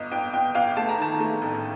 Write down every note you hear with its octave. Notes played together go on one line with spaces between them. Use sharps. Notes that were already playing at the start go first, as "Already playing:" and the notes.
Already playing: G1 D#5
G1 G5
G1 G5
G1 F5
A3 A5
A#5
D#3 A5
A3
A1